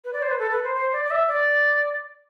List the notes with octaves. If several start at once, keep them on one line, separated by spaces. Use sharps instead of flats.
B4
D5
C5
B4
A4
B4
C5
C5
D5
D5
E5
D5